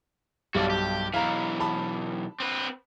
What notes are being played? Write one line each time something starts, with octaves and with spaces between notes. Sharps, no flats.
B1 G2 F#4 D5
G4
B1 E3 F5 A#5
A5 B5
C4 B4